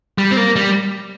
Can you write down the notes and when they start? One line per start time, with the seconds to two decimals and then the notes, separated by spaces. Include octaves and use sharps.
0.18 G3
0.31 C4
0.37 A#3
0.56 G3